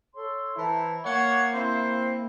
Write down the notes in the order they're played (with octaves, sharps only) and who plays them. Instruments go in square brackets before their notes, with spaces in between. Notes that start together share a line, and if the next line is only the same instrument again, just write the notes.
[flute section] A4 C#5 C6
[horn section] E3 E4 [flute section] C5 A5 A#5
[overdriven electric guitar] A#3 [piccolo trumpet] C#5 [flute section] F5 [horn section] F#5
[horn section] C4 E4 [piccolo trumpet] C5